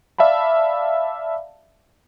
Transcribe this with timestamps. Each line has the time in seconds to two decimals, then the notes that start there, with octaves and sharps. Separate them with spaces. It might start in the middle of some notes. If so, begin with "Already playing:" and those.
0.18 D5 E5 F5 A5 B5